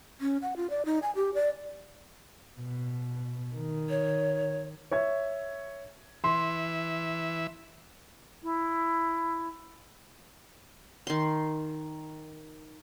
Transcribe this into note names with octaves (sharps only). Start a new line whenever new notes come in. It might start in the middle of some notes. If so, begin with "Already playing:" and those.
C#4
F#5
F4
D5
D#4
G#5
G4
D5
B2
D#3
C#5
C#5 E5 G#6
E3 E5 C6
E4
D#3 C6